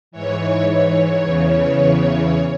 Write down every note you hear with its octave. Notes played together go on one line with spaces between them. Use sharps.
G#2 E3 C#5
C#5
E2 C#3 E3